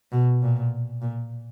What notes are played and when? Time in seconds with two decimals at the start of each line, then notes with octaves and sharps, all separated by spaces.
0.12 B2
0.42 A#2
1.02 A#2